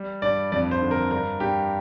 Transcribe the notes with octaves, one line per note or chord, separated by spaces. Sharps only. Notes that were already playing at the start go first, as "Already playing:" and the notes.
Already playing: G3
G2 D5
F2 D5
C5
D3
A#4
G2 A#4
G2 G4